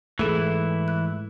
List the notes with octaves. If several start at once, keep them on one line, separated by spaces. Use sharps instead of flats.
G#2 E3 G#3 A3 E4 G#4 A4
F#6